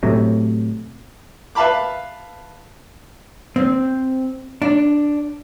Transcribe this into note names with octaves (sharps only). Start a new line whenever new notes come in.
A2 C3 F#3
B4 E5 F5 A5 B5 D6
C4
D4